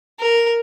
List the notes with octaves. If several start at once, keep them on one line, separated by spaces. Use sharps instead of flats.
A#4